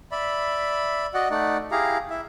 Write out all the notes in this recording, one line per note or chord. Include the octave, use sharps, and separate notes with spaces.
D5 E5 B5
F#4 D5 D#5 F#5
A3 D#4 D5 F#5
E4 G4 G#4 F5 A#5
E4 E5